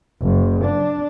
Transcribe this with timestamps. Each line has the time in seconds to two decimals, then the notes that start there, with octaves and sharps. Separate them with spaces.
0.22 F#1
0.64 D4